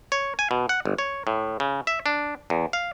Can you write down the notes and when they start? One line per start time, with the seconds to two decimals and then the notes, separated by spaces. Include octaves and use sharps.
0.12 C#5
0.39 G#5
0.51 B2
0.69 F#5
0.85 G1
0.98 C#5
1.27 A2
1.60 C#3
1.87 E5
2.06 D4
2.50 E2
2.73 F5